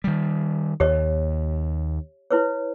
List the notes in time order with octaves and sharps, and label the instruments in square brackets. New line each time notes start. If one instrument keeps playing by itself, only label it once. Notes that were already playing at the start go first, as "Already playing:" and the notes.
[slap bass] D#3 G3
[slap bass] D#2 [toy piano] G4 C#5 D#5
[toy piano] E4 B4 C#5